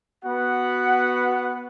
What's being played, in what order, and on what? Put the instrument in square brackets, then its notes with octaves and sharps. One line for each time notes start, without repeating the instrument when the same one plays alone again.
[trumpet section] B3 F#4 B4 F#5